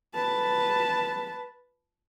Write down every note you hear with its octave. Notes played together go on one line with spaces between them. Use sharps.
B4 A5